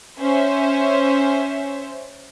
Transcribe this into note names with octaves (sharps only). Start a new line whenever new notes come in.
C#4 C5 E5